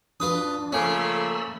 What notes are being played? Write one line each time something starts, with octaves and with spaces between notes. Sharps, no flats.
D4 F4 B4 D#6
C#3 F3 A3 A#3 C#4 A4 B5 E6